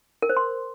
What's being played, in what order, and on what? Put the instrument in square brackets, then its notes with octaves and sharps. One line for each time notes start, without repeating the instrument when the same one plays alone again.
[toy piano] A#4
C5
C6